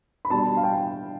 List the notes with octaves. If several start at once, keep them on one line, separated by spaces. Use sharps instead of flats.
B5
B2 G3 D4 A5
F5
G5